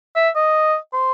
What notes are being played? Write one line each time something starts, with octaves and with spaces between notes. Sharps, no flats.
E5
D#5
C5